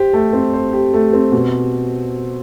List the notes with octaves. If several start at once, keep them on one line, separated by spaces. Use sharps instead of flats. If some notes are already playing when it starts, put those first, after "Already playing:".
Already playing: G4 C5
A3
C4
C5
G4
A3
C4
B2